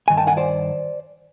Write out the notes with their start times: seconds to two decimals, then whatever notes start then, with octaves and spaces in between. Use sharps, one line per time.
0.08 G2 D#3 G#5
0.17 G5 A5
0.27 F#5 G#5
0.37 C5 D5